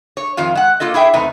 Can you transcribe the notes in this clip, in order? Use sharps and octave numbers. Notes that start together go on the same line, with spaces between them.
C#5
F2 D#3 F4 F5
G#3 F#5
A#3 F4 A4 D#5
E4 G#4 E5 G5
E2 C3 A3 B3 D#4